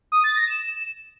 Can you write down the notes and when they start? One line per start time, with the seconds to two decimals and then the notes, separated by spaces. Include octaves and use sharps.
0.12 D#6
0.24 A6
0.36 A#6
0.48 E7